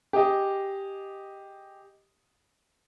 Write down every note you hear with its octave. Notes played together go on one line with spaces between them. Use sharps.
G4 G#4 D#5